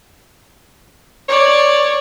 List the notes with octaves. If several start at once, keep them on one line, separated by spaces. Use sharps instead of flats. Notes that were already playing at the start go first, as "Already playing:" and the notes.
C#5 D5